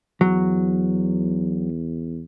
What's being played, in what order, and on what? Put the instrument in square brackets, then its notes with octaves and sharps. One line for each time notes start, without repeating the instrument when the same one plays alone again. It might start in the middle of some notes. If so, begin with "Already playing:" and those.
[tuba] E2 [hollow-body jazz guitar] F#3